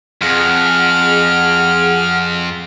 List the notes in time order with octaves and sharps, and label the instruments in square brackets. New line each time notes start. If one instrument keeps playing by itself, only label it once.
[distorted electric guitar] F2 [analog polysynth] G#4 F#5 [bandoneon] F6